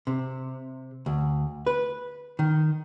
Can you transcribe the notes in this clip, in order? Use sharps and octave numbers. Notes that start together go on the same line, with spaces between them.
C3
D2
B4
D#3